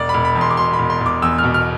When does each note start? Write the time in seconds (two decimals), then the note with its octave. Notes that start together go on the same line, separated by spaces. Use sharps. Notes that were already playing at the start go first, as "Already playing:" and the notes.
Already playing: E1 D5
0.09 B5
0.14 E1
0.25 B5
0.35 E2
0.41 C6
0.51 D6
0.57 B2 C6
0.73 B5
0.79 E1
0.90 C6
1.00 E1
1.06 D6
1.22 E2 E6
1.38 B2 F6
1.54 F6